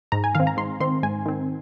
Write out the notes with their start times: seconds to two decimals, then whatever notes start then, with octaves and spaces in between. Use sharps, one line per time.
0.12 G#2 A#5
0.24 G#5
0.35 D#3 C4 F5
0.47 A#5
0.57 G#2 C6
0.80 D#3 C4 C6
1.03 G#2 G#5
1.26 D#3 C4